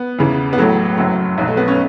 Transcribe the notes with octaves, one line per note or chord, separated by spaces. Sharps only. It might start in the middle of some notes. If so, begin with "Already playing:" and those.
Already playing: B3
E2 C#3 E3
B3
A1 A2 F#3 A3
F#1 F#2 F#3
B1 B2 F#3
A3
B3
C#4